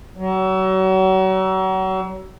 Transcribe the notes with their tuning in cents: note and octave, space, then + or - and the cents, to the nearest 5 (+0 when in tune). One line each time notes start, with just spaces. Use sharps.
F#3 +35